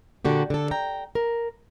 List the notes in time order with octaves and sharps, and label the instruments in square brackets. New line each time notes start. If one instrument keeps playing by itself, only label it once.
[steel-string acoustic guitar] A#2 D3 F#4 G4
D3 A4
G5 A#5
A#4